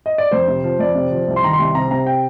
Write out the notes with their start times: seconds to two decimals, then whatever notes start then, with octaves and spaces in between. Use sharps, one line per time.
0.06 D#5
0.18 D5
0.31 F2 C5
0.48 C3
0.64 F3
0.79 F2 D5
0.95 C3
1.11 F3
1.28 C2
1.36 C6
1.43 D#3 A#5
1.53 C6
1.59 C2
1.75 C3 A#5
1.91 C3 A#5
2.06 G5